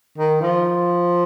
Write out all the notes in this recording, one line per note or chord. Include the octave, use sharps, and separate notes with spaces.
D#3
F3